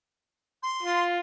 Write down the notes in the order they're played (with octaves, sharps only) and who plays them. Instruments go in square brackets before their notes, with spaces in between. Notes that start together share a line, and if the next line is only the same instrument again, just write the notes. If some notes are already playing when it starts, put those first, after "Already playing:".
[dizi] C6
[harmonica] F4